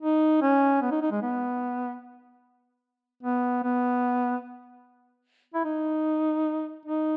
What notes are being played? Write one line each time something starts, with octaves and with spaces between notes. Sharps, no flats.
D#4
C#4
B3
D#4
D#4
G#3
B3
B3
B3
E4
D#4
D#4